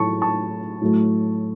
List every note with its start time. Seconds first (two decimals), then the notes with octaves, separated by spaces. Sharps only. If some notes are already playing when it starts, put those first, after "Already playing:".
Already playing: A2 F#3 A3 A5 C#6
0.22 A5 C#6
0.81 A2 F#3 A3